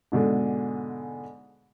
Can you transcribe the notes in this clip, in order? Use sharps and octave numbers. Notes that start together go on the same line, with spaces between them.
G#2 B2 D3 G#3